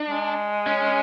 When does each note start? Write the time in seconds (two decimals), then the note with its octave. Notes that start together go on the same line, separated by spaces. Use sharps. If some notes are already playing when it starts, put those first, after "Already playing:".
Already playing: D4
0.09 G#3
0.67 C#4